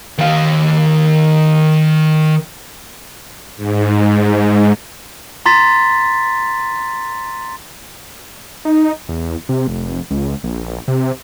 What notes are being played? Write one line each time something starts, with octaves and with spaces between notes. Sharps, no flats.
D#3 F5
G#2
A#5 C6 A6 B6
D#4
E2
C3
F1
C#2
A#1
C3